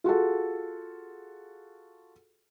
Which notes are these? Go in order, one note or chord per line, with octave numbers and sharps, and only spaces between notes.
F4 F#4 G#4 A4